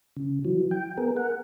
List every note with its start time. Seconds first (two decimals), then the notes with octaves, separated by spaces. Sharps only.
0.17 C#3
0.45 E3 F#3
0.71 G5
0.97 B3 G#4 A#4
1.16 A#4 F#5